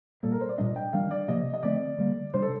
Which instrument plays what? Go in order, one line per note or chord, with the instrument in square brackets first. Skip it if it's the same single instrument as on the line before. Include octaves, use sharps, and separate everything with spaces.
[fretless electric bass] A#2 G3 A#3 [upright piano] A4
[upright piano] A#4
C5
D5
[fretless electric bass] A#2 G3 D4 [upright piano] D#5
[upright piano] G5
[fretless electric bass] D#3 G3 D4 [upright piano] F5
[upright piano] D5
[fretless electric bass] C3 F3 A#3 [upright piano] D#5
[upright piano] D#5
[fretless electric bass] D3 F3 A3 C4 [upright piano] D5
[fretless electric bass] D3 G3 A#3
[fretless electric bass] C3 G3 D4 [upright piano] C5
[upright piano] A4